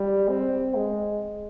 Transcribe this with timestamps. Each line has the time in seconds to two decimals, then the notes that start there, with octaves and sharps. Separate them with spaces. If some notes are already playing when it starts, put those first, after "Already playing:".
Already playing: G3
0.29 C4
0.75 G#3